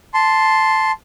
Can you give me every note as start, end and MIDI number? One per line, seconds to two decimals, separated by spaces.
0.14 0.91 81
0.14 0.91 84